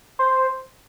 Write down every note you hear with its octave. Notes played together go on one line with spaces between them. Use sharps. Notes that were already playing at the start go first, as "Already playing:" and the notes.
C5